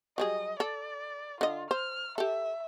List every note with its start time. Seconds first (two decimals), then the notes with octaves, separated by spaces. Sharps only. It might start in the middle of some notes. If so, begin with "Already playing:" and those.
0.18 F#3 G3 G#4 D#5
0.60 A4 D5
1.41 D3 F4 D#5
1.71 C5 F6
2.18 G4 A4 E5